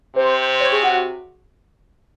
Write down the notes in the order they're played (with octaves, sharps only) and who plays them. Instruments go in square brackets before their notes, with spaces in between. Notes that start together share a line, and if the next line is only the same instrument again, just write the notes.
[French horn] C3 [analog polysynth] C5
[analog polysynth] C#5
G#4
F#4